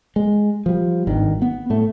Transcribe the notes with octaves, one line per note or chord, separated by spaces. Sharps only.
G#3
F3 G3
G#1 G2 D#3
B3
A2 A3